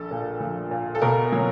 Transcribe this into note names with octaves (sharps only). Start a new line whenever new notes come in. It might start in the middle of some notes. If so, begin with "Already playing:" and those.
Already playing: A#1 A4
A#2
F3
A#2
A4
B2 A#4
F#3